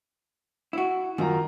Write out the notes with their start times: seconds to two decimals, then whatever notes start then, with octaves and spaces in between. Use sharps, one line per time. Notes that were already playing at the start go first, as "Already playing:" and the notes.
0.73 E4 F#4
1.18 F#2 D#3 F4 A#5